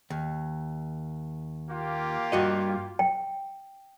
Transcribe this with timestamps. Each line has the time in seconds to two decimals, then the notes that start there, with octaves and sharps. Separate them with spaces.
0.10 D#2
1.69 A#3 F4 G4
2.32 G2 F#4 D#5
2.99 G5